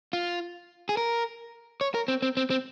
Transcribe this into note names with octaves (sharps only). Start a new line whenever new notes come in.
F4
G#4
A#4
C#5
A#4
C4
C4
C4
C4